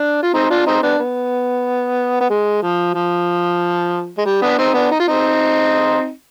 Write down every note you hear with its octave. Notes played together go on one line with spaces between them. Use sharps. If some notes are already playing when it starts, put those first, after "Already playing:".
Already playing: D4
F4
C4 D#4
D4 F4
C4 D#4
B3 D4
B3
B3
G#3
F3
F3
G#3
G3
B3 D4
C4 D#4
B3 D4
D#4
F4
C4 D#4